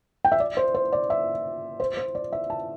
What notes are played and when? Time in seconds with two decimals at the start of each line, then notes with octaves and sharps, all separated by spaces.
0.25 G5
0.32 E5
0.40 D5
0.57 C5
0.74 C5
0.92 D5
1.10 E5
1.80 C5
1.97 C5
2.15 D5
2.32 E5
2.50 A5